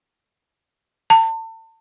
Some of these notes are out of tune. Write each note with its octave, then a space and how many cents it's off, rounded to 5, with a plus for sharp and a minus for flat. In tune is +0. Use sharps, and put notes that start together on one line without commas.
A5 +35